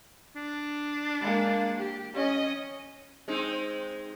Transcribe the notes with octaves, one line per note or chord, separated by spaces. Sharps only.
D4
G#3 A#3
G4
C#4 D#5
G#3 C4 D#4